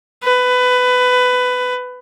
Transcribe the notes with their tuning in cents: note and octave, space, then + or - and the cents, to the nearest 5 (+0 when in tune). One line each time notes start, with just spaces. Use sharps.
B4 +20